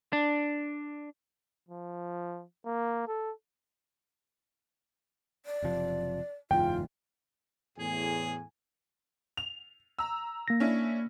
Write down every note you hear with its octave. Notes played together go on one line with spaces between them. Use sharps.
D4
F3
A#3
A4
D5
F#1 C3 F3
F#1 E2 G#2 F4 G5
E2 A2 G#4 G#5
F7
A#5 E6
A#3 A#6
C#4 D4 E4